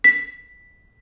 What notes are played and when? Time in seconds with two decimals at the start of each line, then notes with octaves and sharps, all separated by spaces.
0.04 B6